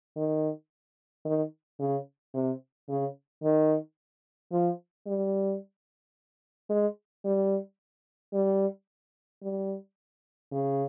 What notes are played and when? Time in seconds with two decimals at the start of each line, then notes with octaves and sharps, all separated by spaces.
0.16 D#3
1.25 D#3
1.79 C#3
2.34 C3
2.89 C#3
3.43 D#3
4.52 F3
5.07 G3
6.70 G#3
7.25 G3
8.33 G3
9.42 G3
10.52 C#3